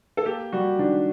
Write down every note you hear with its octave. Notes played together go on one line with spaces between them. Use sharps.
A4
A#3 G4
G3 F#4
D#3 D4